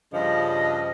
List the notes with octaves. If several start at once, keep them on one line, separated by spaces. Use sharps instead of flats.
G2 C#3 F3 D#5